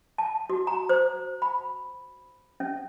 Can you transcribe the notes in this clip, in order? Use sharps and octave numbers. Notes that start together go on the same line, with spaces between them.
A5
F#4
A#5
C5
B5
C#4